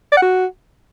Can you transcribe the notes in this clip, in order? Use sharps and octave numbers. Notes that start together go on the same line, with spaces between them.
D5
F#5
F#4